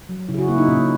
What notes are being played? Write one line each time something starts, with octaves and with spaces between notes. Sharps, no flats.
F#3
C#3 E4
G#4
F#4
A#3 E4
D#4
A#2 C#4